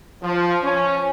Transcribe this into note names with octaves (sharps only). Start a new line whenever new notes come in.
F3
C#4